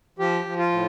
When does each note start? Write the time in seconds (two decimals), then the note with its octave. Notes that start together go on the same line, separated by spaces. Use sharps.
0.19 F3 G4
0.45 F3
0.59 F4
0.72 A2